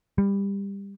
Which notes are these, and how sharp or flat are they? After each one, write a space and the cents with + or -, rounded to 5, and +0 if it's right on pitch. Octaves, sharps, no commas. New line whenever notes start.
G3 +20